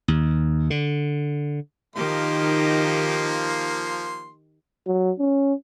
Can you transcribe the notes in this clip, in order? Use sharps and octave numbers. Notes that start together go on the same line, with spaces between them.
D#2
D3
D#3 F3 A#3 D#4 G4 C6
F#3
C#4